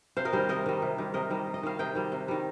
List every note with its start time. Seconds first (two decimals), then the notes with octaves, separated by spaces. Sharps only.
0.17 C3 C5 F5
0.25 A#4 D#5
0.33 D#3 G3 G4 C5
0.49 C3 A#4 D#5
0.66 D#3 G3
0.82 C3
0.98 D#3 G3
1.14 C3 A#4 D#5
1.30 D#3 G3
1.47 C3
1.54 D#5
1.63 D#3 G3 F5
1.79 C3 D#5 G5
1.95 D#3 G3
2.12 C3
2.28 D#3 G3